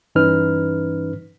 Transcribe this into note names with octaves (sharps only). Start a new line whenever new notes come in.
G2 E3 C#4 D#4 B4 F6